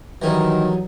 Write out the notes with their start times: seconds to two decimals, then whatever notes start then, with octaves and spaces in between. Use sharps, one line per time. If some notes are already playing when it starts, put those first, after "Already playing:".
0.22 D#3 E3 F#3 G3 D#4 B4 D5 E5